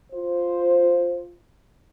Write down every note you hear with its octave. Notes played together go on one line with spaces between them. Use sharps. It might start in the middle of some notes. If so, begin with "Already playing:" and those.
F4 C5